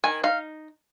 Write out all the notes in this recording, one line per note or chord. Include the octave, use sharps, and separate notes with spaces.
D#3 G#5
D#4 F5